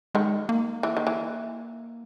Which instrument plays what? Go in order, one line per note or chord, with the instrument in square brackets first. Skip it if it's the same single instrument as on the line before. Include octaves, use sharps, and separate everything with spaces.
[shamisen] D#3 [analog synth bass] G#3
[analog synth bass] A#3
[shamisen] E3
D#3
E3